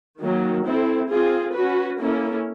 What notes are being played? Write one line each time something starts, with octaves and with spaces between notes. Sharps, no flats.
D#3 F#3 A#3
C4 E4 A4
C4 F4 G#4
C#4 F#4 B4
A#3 C#4 E4 A4